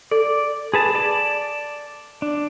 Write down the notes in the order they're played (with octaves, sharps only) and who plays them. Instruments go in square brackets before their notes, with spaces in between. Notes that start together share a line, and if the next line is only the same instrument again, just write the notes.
[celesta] A4 [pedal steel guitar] D5
[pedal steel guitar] G#4 B4 A5
D5 A5
D4